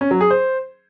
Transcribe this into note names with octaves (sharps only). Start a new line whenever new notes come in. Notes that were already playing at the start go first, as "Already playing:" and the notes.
C#4
F#3
G#4
C5